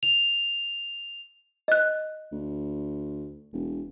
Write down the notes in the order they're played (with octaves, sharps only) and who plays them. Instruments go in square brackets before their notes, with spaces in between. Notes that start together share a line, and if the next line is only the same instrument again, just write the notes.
[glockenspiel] F7
[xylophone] D#5 F#6
[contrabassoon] D2
E1